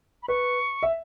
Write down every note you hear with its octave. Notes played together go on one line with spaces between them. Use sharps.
B5
B4 C#6
E5